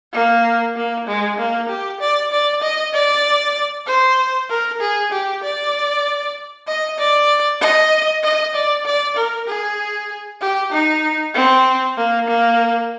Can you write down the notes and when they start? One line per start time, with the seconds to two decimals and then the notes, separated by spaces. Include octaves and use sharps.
0.13 A#3
0.76 A#3
1.07 G#3
1.38 A#3
1.69 G4
2.00 D5
2.32 D5
2.62 D#5
2.94 D5
3.87 C5
4.50 A#4
4.81 G#4
5.12 G4
5.43 D5
6.67 D#5
6.99 D5
7.61 D#5
8.23 D#5
8.55 D5
8.85 D5
9.16 A#4
9.47 G#4
10.41 G4
10.72 D#4
11.34 C4
11.97 A#3
12.28 A#3